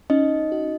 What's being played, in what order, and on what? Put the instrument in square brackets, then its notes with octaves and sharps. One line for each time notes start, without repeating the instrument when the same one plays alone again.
[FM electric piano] C#4 [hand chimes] D#4 D#5
[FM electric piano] F#4